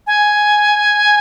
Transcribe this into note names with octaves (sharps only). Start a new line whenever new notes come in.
G#5